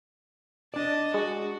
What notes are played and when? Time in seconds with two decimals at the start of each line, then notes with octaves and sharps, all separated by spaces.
0.74 D4 D5 D#5 A5
1.14 G#3 F#4